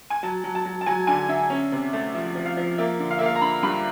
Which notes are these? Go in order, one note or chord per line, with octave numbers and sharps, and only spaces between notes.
G#5
F#3 A5
F#3
A5
F#3
A5
F#3 G#5
D3 G#5
D3 E5
C#4
C3
A3
F3 E5
F3
F5
F3
A#3 E5
D3
F5
A#3 E5
F5
A#5
D3 B5
G2 B5